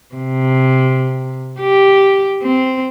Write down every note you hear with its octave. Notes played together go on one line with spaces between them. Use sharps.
C3
G4
C4